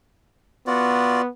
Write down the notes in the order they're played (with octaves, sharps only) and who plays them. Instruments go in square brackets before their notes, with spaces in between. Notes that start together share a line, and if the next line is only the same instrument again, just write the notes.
[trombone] B3 [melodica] F4 F#4 D5